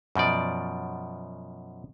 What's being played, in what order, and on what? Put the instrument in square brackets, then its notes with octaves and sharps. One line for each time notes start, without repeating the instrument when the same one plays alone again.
[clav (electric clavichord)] F#2 B2 F3 D5